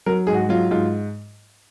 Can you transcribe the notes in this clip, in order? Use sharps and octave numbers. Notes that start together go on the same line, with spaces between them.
F#3 A#4
G#2 G#4
F#4
F#3 F4
G#2 F4